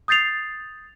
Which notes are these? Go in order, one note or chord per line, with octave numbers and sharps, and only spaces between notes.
D#6 G6 A6 C7 F7